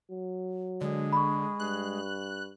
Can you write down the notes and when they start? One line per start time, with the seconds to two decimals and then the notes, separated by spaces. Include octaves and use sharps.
0.11 F#3
0.81 D3 G#3
1.13 B5 C#6
1.60 G2 F#6